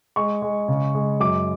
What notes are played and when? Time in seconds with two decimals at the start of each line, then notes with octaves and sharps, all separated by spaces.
0.16 G#3 C#6
0.42 G#3
0.68 C#3
0.95 G#3
1.20 F#2 D6